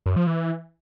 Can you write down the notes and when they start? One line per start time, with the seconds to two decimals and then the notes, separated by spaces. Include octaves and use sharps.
0.06 F#2
0.16 F3
0.27 E3